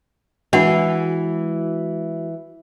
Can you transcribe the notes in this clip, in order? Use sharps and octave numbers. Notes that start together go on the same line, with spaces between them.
E3 G#3 D4 F#4 F#5